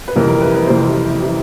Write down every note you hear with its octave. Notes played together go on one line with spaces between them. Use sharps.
B4
F2 C3 E3 G3 A#4
A#4
B4
B4
F2 C3 E3 G3 C5
C3 E3 G3